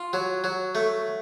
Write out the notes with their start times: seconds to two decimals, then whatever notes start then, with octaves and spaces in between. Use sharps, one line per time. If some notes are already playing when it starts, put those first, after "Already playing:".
Already playing: F4
0.13 F#3
0.44 F#3
0.75 A3